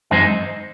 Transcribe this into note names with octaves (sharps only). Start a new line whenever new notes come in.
F#2 E3 G#3 C4 D#4 C5 D#5